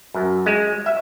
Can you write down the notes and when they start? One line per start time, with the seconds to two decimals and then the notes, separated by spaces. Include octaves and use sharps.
0.14 F#2
0.46 G#3
0.86 E5